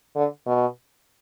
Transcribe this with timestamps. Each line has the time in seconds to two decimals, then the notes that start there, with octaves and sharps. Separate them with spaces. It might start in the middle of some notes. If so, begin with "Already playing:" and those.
0.16 D3
0.46 B2